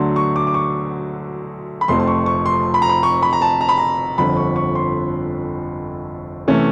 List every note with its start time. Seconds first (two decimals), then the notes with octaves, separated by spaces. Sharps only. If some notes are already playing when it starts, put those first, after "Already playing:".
Already playing: D2 D3 F#3 A3 D4 C6
0.16 C#6
0.36 D6
0.47 D6
0.54 C#6
1.81 B5
1.88 F1 F2 C3 F3 A3 C6
2.00 C6
2.07 C#6
2.26 C#6
2.46 C6
2.74 B5
2.82 A#5
2.89 B5
3.03 C#6
3.23 B5
3.33 A#5
3.41 A5
3.61 A#5
3.69 B5
3.78 A#5
4.18 G1 F2 D3 F3 B5
4.37 C#6
4.56 C#6
4.75 C6
6.48 C3 E3 A3 C#4